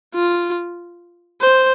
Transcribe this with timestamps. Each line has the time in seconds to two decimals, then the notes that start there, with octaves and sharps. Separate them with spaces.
0.14 F4
1.41 C5